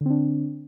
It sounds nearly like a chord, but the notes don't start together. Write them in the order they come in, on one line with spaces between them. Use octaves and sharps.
D3 C4 D4